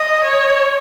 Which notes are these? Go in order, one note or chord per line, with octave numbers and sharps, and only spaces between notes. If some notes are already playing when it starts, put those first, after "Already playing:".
Already playing: D#5
C#5